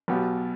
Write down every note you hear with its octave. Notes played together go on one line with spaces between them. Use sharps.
B1 B2 B3 G4